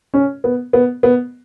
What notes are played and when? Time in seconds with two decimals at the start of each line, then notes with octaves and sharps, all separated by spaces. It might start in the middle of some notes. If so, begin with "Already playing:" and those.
0.14 C#4
0.44 B3
0.73 B3
1.03 B3